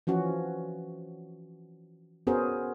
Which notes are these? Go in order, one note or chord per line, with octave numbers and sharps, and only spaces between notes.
E3 F3 C#4 F#4
B3 C#4 F#4 G#4 A#4 C5